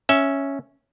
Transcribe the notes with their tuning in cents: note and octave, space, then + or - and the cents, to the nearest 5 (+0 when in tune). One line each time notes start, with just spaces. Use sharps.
C#4 +0 E5 +0